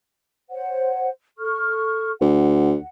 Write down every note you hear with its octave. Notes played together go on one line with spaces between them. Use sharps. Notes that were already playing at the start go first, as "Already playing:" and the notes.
C5 C#5 F#5
A4 C#6 F6
D2 F#5